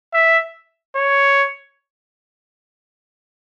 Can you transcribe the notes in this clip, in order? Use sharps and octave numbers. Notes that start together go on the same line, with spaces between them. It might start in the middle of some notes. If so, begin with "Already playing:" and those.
E5
C#5